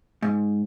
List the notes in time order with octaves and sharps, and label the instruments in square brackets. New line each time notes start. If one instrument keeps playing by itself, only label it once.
[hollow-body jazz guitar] G#2